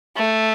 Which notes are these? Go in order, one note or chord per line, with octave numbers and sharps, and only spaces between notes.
A3